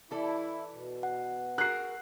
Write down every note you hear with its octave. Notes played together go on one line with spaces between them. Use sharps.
E3 E4 A4 D5
B2
F#5
F#4 G#4 A#4 F#6 C7